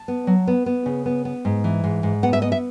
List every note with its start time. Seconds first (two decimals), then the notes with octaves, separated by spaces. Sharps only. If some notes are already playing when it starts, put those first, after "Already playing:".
Already playing: A5
0.08 B3
0.27 F#3
0.47 B3
0.66 B3
0.86 C#3
1.06 B3
1.25 B3
1.45 G#2
1.64 E3
1.84 G#2
2.03 G#2
2.23 B3 F#5
2.33 E5
2.42 B3 D#5
2.52 E5